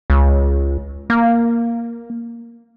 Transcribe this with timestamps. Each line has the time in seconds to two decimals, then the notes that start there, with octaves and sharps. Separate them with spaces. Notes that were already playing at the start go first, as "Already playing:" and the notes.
0.10 C#2
1.10 A#3